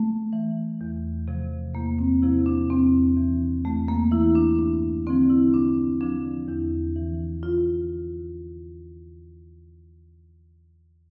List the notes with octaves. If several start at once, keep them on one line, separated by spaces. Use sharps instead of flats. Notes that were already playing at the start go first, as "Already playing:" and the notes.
Already playing: A3
E3
E2
C3 F3
E2 A#3
C4
C3 F3 E4
D4
E2 C4
E3
E2 A3
A#3
E3 E4
D4
G2 D4
D3 F3 C4
E4
G2 D4
D3 F3 D4
E2 E4
E3
F4